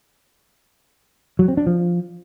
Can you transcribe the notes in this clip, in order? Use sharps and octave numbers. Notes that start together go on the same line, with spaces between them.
F#3
C4
D4
F3